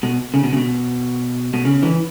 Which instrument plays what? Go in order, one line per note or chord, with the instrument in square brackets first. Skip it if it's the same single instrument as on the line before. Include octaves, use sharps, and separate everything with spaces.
[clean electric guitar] B2
C#3
B2
C#3
B2
B2
C#3
E3